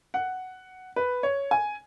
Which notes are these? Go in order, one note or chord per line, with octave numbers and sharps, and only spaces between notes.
F#5
B4
C#5
G#5